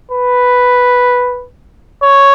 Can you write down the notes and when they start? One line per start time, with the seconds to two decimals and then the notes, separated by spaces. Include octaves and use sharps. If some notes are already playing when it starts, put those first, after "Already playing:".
0.11 B4
2.03 C#5